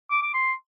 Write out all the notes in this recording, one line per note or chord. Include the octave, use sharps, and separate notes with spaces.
D6
D6
C6